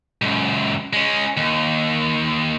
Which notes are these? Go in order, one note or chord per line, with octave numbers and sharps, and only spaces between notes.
C#2 F#2
G#3 C#4
D#2